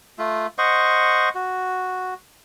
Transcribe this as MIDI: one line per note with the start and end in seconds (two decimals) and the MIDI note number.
0.18 0.47 57
0.18 0.47 65
0.58 1.29 72
0.58 1.29 75
0.58 1.29 78
0.58 1.29 85
1.35 2.14 66